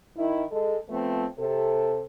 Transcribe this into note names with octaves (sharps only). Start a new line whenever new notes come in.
D#3 E4
G#3 A4
F3 A3 B3 C4
C3 A4